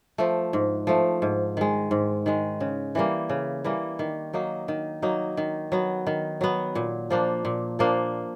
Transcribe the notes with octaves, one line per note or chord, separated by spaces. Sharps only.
F3 A3
G#2
F3 A3
G#2
D#3 G#3
G#2
D#3 G#3
C#3
E3 G3 A#3
C#3
E3 G3 A#3
D#3
F#3 A#3 D#4
D#3
F#3 A#3 D#4
D#3
F#3 B3
D#3
F#3 B3
A#2
F3 A#3 D4
A#2
F3 A#3 D4